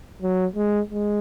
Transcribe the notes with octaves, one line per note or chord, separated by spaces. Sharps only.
F#3
G#3
G#3